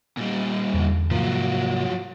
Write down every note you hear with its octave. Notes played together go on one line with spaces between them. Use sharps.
A#2 G3
E2 D3
G#2 C3 F3 F#3 A#3